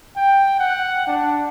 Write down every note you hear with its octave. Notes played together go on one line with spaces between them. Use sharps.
G5
F#5
D4